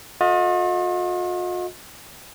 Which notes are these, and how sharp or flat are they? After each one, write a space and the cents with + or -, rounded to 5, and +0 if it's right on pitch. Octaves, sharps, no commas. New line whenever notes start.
F4 +45 A4 +0 D#5 +20